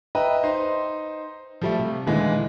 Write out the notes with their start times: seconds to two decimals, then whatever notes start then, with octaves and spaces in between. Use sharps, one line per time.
0.15 B4 D#5 E5 G5 A#5
0.43 D#4 C5 C6
1.61 F3 G3 A3
1.79 C3
2.06 D#2 A#2 D3 E3 G#3